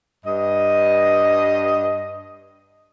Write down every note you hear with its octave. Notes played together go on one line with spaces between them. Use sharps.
G2 D#5